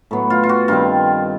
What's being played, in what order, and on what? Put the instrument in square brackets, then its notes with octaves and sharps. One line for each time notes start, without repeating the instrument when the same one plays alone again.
[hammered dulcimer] A2 F#3 B3
F4
F4
F#4
G2 D#3 G3 C4 F4